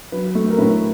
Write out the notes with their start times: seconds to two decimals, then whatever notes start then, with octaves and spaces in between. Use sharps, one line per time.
0.12 F#3 B4
0.35 A3
0.50 A#4
0.58 A2 B4